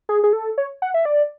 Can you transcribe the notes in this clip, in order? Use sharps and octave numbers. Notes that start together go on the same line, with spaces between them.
G#4
G#4
A4
C#5
F#5
E5
D5